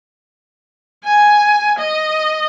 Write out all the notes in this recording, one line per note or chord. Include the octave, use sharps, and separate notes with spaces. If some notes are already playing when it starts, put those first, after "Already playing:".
G#5
D#5